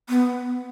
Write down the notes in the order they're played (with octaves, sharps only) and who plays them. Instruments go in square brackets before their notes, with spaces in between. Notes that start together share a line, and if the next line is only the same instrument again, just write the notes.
[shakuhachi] B3